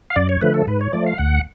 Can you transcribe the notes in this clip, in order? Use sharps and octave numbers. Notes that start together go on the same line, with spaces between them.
F5
F#2 D5
C#5
D3 F3 A3 B4
A4
G#2 B4
C#5
F3 A3 D5
F5
D2 F#5